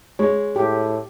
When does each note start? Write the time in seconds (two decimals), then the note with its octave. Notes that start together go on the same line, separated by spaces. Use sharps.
0.19 G#3 C#5
0.56 A2 G4